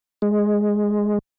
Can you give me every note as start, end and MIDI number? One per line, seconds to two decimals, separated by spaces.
0.22 1.18 56